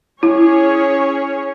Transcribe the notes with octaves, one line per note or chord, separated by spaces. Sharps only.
C#4 E4 G#4 C#5